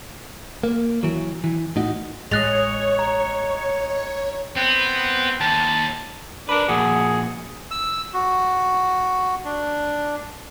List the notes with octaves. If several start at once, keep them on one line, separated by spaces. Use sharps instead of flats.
A#3
E3 F#3
E3
A2 D#4 F#4
A1 G#3 C#5 D#5 F#6 A6 F7
A#5
B3 C4
D#2 A5
D4 A#4 B4
A#2 F3 F#4 G#4
E6
F#4
D4